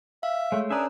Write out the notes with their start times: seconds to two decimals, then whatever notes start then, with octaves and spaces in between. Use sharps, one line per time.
0.23 E5 F5
0.52 G#3 A3 C#5
0.70 C#4 D4 G#4 A#4 B4 E5 A#5